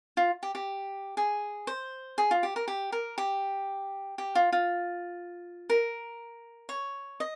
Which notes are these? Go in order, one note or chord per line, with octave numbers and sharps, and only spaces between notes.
F4
G4
G4
G#4
C5
G#4
F4
G4
A#4
G4
A#4
G4
G4
F4
F4
A#4
C#5
D#5